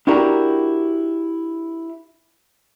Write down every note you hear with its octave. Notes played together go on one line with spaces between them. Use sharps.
D4 E4 F#4 G4 A#4